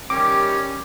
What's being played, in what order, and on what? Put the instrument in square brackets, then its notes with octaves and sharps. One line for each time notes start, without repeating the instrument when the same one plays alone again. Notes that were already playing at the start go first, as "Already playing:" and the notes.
[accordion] D#3 G3 G4 [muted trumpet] C#4 [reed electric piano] D6